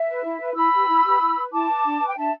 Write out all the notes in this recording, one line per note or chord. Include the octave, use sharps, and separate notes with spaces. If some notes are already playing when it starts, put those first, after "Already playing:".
Already playing: E5
B4
E4
B4
E4 B5 E6
G4 B4
E4
G4 B4
E4
B4
E4 A5 D6
B4
D4
B4
G5
D4 E5 A5